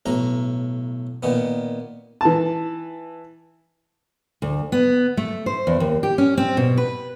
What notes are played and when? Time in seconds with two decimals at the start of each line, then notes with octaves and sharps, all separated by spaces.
0.06 B1 A2 A#5
1.23 A#2 D#3 B3
2.21 E3 A5
4.42 D2
4.72 B3
5.17 A3
5.46 C5
5.67 E2
5.80 D#2
6.03 G4
6.18 C#4
6.38 C4
6.57 B2
6.77 B4